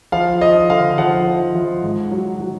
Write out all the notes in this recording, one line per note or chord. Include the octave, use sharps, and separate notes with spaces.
F3 F5
F3 D#5
D3 F5
F3 F#5
F3
F3
G#2
F#3
F#3